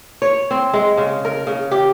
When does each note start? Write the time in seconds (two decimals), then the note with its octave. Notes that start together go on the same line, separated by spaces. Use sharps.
0.22 C#5
0.51 C4
0.73 G#3
0.97 C#3
1.25 A#4
1.47 C#3
1.71 G4